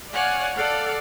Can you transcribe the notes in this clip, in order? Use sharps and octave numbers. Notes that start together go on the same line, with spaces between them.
C#5 D5 F5 F#5 G#5
A4 D5 F5 F#5